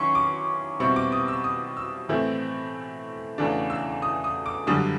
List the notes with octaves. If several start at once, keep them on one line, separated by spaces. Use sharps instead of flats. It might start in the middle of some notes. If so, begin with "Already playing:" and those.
Already playing: D#3 F#3 C#4 E4 C6 C#6
D6
B2 G3 C4 E4 C#6
D6
D#6
E6
D#6
E6
A2 E3 A3 C4 E4
E2 C#3 E3 A3 D4
E6
D#6
D#6
D6
F#2 D3 G3 D#6